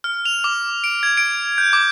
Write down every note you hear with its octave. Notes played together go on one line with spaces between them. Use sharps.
F6
F7
D6
D7
G#6
D7
G6
D6